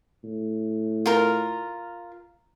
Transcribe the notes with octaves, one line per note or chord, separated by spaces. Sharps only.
A2
F4 A#4